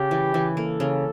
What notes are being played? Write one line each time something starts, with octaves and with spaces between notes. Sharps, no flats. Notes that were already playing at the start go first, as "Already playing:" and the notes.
Already playing: C#3 G4
E3
E3
A#3 A4
C#3